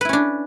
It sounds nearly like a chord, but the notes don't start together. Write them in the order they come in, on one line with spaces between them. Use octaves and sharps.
B4 E4 C#4 D4